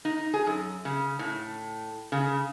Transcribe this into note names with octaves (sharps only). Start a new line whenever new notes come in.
D#4
G#4
F#2
C#3
A2
C#3